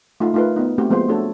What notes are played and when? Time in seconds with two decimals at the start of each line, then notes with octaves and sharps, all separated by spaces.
0.20 A3 D#4 F4
0.34 A3 D#4 F4 A#4 B4
0.56 B3 D#4
0.78 A3 C4 F#4 G4
0.90 F3 G#3 A#3 B3 C5
1.09 A3 D4 F#4 A4 C#5